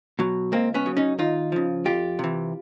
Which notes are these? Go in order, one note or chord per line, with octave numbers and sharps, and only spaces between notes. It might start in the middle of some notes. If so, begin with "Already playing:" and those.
B2 F#3
C#2 A#3 C4
B3 C#4
C#3 F#3
C#4 D#4
D#2 D#4 F4
C#3 F3
F2 F4 G4
C3 E3